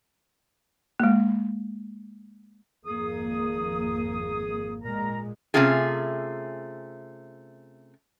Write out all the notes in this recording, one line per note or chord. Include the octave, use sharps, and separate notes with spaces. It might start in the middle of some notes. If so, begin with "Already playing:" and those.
G#3 A#3
G#1 F2 A#3 G#4 D#6
A#2 G#3 A#4 A#5
C3 E3 A3 C#4 F4 G#4